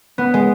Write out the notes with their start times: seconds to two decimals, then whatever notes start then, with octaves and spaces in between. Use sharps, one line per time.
0.18 B3
0.34 G#3